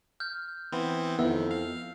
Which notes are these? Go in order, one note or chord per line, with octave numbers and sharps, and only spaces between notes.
F6 G6
E3 B3 C4
F2 D#3 B3 E4 E6
F5